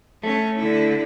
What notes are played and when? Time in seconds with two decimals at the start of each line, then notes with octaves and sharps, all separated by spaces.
0.23 A3 C#4
0.59 D3 E4